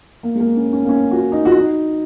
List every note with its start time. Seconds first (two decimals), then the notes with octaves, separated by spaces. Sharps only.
0.23 A#3
0.35 G#3
0.40 A#3
0.56 C#4
0.73 C#4
0.85 A#3
0.89 C#4
1.11 F#4
1.32 D#4
1.45 F#4
1.58 D#4